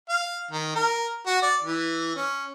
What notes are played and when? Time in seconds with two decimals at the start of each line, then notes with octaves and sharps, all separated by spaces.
0.09 F5
0.51 D#3
0.76 A#4
1.26 F#4
1.42 D5
1.63 E3
2.16 C#4